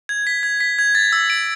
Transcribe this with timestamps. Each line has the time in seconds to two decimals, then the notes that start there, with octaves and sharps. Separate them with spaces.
0.09 G#6
0.27 B6
0.43 G#6
0.60 B6
0.78 G#6
0.95 A6
1.13 E6
1.30 D7